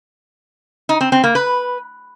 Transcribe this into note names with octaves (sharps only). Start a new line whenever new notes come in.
D#4
C4
C4
A#3
B4